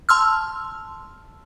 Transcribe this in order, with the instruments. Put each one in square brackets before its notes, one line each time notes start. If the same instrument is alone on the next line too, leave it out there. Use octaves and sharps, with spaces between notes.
[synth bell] A5 C6 E6 F6